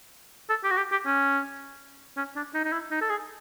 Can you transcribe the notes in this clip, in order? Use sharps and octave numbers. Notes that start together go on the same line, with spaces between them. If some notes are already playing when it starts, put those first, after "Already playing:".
A4
G4
F#4
G4
G4
C#4
C#4
D4
D#4
D#4
E4
D#4
A4
G#4